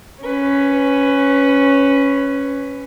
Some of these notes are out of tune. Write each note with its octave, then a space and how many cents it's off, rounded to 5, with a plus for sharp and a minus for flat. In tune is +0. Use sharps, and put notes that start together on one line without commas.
C#4 +0 B4 +15